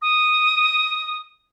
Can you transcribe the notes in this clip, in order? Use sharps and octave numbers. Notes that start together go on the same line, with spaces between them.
D#6